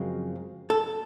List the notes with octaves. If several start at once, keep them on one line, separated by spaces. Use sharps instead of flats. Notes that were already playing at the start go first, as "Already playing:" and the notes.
Already playing: F#2 C#3 F3 G#3 C4
A4